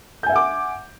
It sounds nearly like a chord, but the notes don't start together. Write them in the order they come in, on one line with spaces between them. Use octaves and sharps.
G6 G#5 E5 F#5 D6